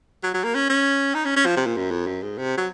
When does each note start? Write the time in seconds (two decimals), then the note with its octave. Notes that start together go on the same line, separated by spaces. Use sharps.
0.23 F#3
0.34 F#3
0.44 A#3
0.55 C#4
0.69 C#4
1.14 D#4
1.25 C#4
1.36 C#4
1.46 F3
1.56 C3
1.66 A#2
1.77 F#2
1.91 F2
2.07 F#2
2.23 G#2
2.38 C3
2.57 F#3